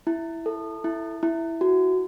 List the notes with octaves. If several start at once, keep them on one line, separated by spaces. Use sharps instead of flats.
E4
A4
E4
E4
F#4